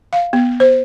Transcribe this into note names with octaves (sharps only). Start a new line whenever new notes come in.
F5
B3
C5